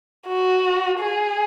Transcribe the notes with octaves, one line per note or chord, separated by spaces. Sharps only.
F#4
G#4